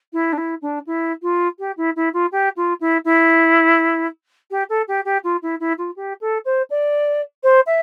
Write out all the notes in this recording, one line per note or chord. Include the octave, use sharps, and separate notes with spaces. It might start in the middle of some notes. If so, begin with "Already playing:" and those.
E4
D4
E4
D4
E4
F4
G4
E4
E4
F4
G4
F4
E4
E4
G4
A4
G4
G4
F4
E4
E4
F4
G4
A4
C5
D5
C5
E5